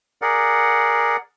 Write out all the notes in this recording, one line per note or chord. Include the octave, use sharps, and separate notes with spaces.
G#4 A#4 D5 F#5